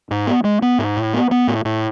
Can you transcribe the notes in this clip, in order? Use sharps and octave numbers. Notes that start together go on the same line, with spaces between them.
G#2
B3
G#3
B3
G#2
A2
B3
B3
A2
A2